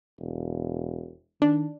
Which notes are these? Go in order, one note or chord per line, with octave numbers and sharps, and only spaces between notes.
E1
D#3 D4